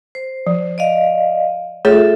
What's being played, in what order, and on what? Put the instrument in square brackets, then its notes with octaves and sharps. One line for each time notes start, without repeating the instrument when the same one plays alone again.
[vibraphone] C5
[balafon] F3
[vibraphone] D5 D#5 F5
[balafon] A3 G#4 C#5 [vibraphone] F4 A4 E5